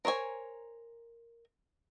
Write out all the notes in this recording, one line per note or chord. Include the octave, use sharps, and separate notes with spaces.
A#4 C5 C#5 G#5